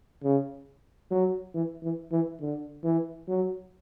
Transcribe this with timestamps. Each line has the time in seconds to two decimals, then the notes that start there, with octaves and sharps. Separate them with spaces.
0.24 C#3
1.11 F#3
1.54 E3
1.83 E3
2.12 E3
2.41 D3
2.84 E3
3.28 F#3